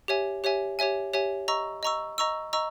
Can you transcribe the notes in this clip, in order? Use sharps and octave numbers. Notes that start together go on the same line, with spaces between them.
G4 C#5 E5 G#5
G4 C#5 E5 G#5
G4 C#5 E5 G#5
G4 C#5 E5 G#5
D#5 A#5 C#6 E6
D#5 A#5 C#6 E6
D#5 A#5 C#6 E6
D#5 A#5 C#6 E6